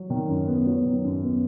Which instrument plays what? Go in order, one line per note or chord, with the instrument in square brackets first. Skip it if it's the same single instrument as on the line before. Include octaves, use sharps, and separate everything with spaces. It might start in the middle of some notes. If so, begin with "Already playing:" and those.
Already playing: [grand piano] F#3
D#3
F#2
B3
F#3
D#3
F#2
B3